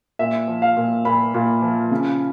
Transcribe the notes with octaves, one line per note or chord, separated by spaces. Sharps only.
A#2 E5
F3
F5
A#2
A#2 B5
A#2
F3
C#3